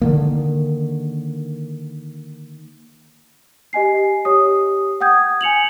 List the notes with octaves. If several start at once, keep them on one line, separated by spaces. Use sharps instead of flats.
D3 D#3 A#3
G4 D#5 G#5 C7
G4 C#5 D#6
F#5 G5 D#6 G6 G#6
G#5 C#7 F7 F#7